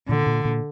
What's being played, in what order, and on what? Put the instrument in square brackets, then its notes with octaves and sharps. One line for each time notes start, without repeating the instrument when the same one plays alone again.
[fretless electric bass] A#2 [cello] D3
[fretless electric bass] A#2
A#2